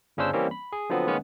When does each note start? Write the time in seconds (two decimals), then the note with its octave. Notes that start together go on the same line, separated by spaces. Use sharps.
0.17 G1 C#3 C#4 D4 C5 E6
0.33 E3 G3 A#3 C4 C#4
0.51 B5
0.72 G#4
0.90 D3 F3 F#3 B3 C4
1.06 D#3 G#3 A#3 B3 C#4